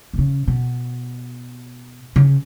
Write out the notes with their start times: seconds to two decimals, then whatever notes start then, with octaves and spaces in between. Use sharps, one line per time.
0.14 B2
0.18 C#3
0.48 B2
2.16 C#3